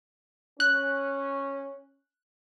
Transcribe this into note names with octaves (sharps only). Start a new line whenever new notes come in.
C#4 F#6